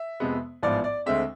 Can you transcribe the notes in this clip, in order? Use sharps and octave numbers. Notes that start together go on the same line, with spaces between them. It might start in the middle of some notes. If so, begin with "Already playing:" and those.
Already playing: E5
F2 C3 G#3 B3
A1 G#2 F3 B3 D5
D5
D2 D3 G#3 C4 E5